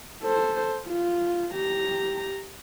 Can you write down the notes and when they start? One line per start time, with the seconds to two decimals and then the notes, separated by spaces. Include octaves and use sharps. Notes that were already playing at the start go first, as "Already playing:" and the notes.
0.23 A4 C5
0.87 F4
1.54 G4 A#5